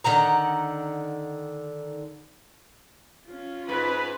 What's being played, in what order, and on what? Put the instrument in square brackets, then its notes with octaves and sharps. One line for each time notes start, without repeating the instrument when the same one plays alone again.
[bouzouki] D3 D#3 F#5 A#5
[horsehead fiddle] C#4 F4
[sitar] G#2 [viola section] B4